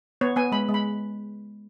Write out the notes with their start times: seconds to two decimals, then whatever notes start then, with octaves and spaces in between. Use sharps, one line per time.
0.21 B3 C#5
0.36 B3 G#5
0.52 G#3 B5
0.69 G#3
0.74 B5